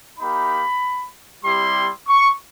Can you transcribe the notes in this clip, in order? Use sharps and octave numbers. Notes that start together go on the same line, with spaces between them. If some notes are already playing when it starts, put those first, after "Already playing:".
A#3 D#4 G4 B5
G3 C4 E4 G4 C6
C#6